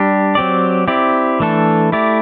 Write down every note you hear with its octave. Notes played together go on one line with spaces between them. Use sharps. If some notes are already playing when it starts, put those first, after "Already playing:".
Already playing: G3 D4 G4
F#3 C4 G4 D5
C4 E4 G4 D5
E3 A3 D4 A4
A3 E4 G4 D5